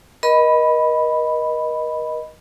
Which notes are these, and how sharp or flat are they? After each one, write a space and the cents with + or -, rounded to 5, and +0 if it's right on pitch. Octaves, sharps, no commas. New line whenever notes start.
A#4 +40 D#5 +0 B5 +0